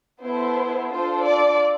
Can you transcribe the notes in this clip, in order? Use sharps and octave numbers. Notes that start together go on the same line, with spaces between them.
B3 E4 A4 C5
D4 F4 A4 C5
D5